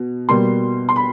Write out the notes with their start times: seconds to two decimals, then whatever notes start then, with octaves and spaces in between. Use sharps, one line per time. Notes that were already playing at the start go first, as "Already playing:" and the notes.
Already playing: B2
0.29 B2 G3 A#3 C6
0.89 C6
0.96 B5